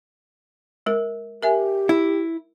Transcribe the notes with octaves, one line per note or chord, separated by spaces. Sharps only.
G#3 A#4
G4 A#4 E5 G#5
E4